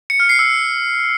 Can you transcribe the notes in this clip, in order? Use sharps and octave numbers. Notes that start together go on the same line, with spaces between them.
C#7
F6
C7
E6